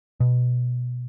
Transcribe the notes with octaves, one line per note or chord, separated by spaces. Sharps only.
B2